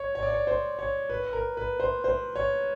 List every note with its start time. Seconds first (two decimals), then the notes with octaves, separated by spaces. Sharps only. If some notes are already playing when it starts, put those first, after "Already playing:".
Already playing: C#5
0.15 C#5
0.23 D5
0.30 C#5
0.47 C5
0.79 C#5
1.09 B4
1.33 A#4
1.57 B4
1.80 C5
2.04 C5
2.36 C#5